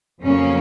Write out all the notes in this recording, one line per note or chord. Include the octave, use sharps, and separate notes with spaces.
F2 C#3 F#3 A#3 C#4